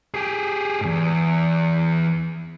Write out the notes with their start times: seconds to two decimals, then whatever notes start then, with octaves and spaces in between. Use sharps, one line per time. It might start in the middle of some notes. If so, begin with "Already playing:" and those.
0.14 G4 G#4
0.81 E2 G#2